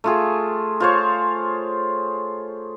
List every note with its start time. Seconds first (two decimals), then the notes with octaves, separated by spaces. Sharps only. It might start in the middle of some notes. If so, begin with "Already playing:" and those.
0.04 A3 F4 G#4
0.80 F4 C5 C#5